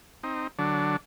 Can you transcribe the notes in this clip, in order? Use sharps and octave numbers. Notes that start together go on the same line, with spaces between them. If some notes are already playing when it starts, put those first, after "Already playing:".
C4 D#4
D3 F#3 D4